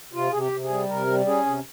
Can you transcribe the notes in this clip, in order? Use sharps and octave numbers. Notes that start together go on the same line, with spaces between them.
C3 F4
C3 G#4
G4
C3
G#4
G3
C3 A#4
G3
C#4 G#4
C3